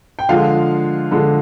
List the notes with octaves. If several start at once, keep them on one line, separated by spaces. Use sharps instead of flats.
G5
D3 F3 G#3 F4 F5
D3 F3 G#3